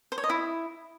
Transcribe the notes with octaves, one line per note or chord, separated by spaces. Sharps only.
C5
C#5
D#5
E4